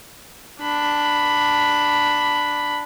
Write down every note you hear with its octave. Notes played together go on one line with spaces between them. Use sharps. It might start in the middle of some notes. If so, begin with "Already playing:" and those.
D4 B5